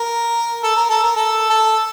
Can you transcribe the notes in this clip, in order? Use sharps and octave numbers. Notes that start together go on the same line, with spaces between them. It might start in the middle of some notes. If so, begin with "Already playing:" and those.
Already playing: A#4
A4
A#4
A4
A#4
A4
A4